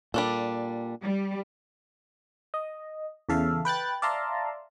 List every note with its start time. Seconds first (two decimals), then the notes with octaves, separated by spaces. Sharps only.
0.14 A#2 G3 D4 A4
1.02 G3
2.54 D#5
3.29 E2 C#3 A4 E5 F5
3.65 B4 G5 F#6 A6
4.02 D5 E5 F5 A5 A#5 C6